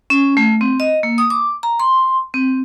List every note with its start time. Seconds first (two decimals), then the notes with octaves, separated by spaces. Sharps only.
0.10 C#4
0.37 A3
0.61 C4
0.80 D#5
1.03 A#3
1.18 D#6
1.30 D6
1.63 A#5
1.80 C6
2.34 C4